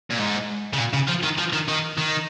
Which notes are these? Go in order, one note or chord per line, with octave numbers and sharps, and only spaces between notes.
A#2
G#2
C#3
A#2
C#3
F3
D#3
F3
D#3
D#3
D#3